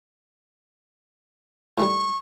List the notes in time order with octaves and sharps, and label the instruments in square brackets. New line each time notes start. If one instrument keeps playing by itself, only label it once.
[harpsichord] A2 D#3 G3 [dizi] C#6